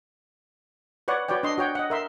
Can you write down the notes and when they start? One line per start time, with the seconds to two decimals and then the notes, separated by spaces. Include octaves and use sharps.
1.08 B4 C#5 D5 F#5
1.29 F#4 B4 C#5 D5 G5
1.43 D4 D#5 C6
1.58 F#4 C#5 G5
1.75 D#5 F#5
1.90 A#4 E5 C6